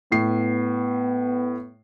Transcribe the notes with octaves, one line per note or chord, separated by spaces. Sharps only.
A2 B3 C7